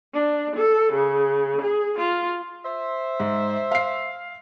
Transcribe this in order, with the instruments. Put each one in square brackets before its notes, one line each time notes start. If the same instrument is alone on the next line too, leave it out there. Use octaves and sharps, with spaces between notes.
[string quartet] D4
A4
C#3
G#4
F4
[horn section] C5 E5
[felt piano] G#2
F5 C7